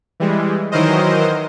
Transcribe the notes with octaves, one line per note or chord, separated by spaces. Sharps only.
E3 G3 G#3
D#3 E3 F#3 A#4 C5 D#5